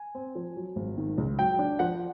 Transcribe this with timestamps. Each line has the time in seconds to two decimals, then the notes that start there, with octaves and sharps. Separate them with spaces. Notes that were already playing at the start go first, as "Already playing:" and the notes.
Already playing: G#5
0.15 C4
0.35 F3
0.56 F#3
0.76 G#1
0.98 D#3
1.18 C#2
1.39 F#3 G5
1.59 D4
1.79 F3 F#5